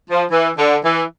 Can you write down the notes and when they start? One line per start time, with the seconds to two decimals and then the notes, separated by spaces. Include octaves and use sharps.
0.10 F3
0.31 E3
0.57 D3
0.84 E3